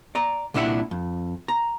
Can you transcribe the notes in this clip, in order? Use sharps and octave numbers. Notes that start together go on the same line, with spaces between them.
D5 A#5
C2 A#2 D4 E4 E5 F#5
F2
A#5